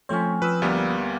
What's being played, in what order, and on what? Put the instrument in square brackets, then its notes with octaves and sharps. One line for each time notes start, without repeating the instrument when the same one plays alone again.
[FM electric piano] F3 A3 C#5 [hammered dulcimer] C4 C#4
[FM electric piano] F3 D#6 E6 [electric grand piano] B4
[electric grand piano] D2 G3 B3 [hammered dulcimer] A#3